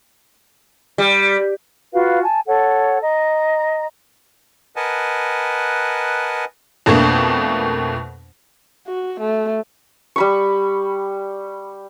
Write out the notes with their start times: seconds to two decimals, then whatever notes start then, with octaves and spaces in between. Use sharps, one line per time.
0.98 G3
1.93 F4 F#4 B4 F5
2.23 G#5 A5
2.46 A4 C#5 F#5
3.02 D#5 A#5
4.76 A#4 B4 D#5 F#5 G#5 A5
6.86 F2 B2 A3 A#3 D4
8.87 F#4
9.20 A3
10.16 G3 B5 C#6